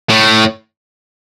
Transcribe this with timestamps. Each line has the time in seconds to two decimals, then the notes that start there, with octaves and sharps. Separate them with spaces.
0.10 A2